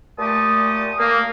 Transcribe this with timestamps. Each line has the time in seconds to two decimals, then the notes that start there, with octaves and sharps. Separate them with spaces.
0.19 A#2 A3 G4 A5 D#6
0.99 A#3